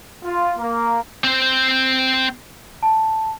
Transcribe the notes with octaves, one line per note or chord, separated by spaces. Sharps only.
F4
A#3
C4 C5
A5